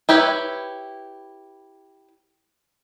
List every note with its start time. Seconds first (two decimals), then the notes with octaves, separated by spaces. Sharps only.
0.09 E4 G4 B4 C#5